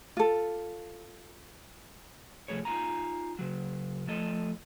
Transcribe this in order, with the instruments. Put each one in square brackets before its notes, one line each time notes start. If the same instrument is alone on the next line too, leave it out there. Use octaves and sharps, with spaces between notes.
[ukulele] F4 A4
[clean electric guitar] C2 F3 A3 G#4 C#5
D#4 F4 G#4 F5 G#5 A#5
C#3 F#3
F3 A3 A4 D#5